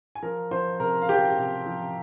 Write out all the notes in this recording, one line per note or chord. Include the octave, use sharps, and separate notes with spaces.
G#5
F3 A#4 A#5
F3 C5 C6
C3 A#4 A#5
F5
F3 G4 G5
C3
F3